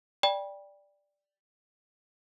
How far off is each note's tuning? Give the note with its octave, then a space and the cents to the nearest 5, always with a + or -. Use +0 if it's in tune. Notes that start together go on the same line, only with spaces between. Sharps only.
D5 +0 G5 +20 B5 -25